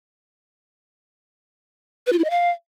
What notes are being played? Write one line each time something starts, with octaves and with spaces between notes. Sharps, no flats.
B4
F4
E4
D#5
F5